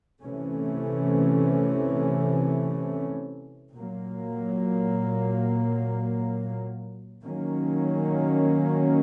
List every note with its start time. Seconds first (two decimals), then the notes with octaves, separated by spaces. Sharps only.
0.23 C3 E3 A3 C#4
3.74 A#2 F#3 A#3
7.24 D#3 F#3 A#3 C#4